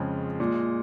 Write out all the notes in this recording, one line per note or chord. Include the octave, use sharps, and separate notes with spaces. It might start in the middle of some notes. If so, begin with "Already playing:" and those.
Already playing: F2 C#3 F3 G#3
A#2 G#3